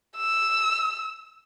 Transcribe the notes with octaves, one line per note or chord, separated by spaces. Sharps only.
E6